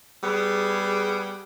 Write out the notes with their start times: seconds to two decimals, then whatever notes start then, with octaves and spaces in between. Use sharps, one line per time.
0.23 G3 B3 G#4